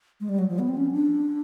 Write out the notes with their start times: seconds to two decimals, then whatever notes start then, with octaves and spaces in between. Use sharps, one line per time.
0.20 G#3
0.29 G3
0.39 F#3
0.49 F3
0.59 B3
0.69 C4
0.77 C#4
0.92 D4